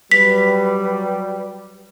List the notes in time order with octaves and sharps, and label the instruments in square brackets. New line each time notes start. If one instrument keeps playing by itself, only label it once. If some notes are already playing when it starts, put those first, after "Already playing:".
[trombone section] F#3 G3 [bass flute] B4 [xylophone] B6